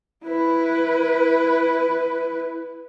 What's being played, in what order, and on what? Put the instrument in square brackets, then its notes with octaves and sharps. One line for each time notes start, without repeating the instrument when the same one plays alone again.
[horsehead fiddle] E4 B4